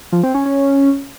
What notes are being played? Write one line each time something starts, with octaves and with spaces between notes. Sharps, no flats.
F3
C4
C#4
C#4